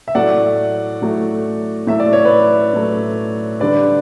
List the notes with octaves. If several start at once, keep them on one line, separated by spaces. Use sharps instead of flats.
E5
A2 F#3 A3 D5 F#5
A2 F#3 A3
A2 F#3 A3 E5
D5
C#5
B4 D5
A2 F#3 A3
D3 G3 D4 B4 D5